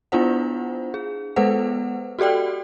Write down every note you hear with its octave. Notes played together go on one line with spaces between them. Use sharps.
B3 D4 E4 F4 C5 F#5
G#4
G#3 B3 A4 B4 C5 F#5
F#4 G4 A4 D5 G5